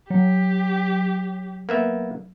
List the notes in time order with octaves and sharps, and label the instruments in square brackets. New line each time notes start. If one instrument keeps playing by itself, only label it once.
[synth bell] F#3 [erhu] G4
[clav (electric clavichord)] A#3 B3 E5